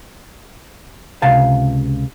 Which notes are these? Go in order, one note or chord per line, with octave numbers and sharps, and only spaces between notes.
C#2 C3 F5 A5